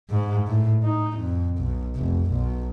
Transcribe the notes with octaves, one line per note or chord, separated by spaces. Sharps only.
G#2
A2
D#4
F2
B1
F1
B1